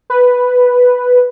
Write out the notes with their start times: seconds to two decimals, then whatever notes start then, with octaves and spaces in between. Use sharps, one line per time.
0.10 B4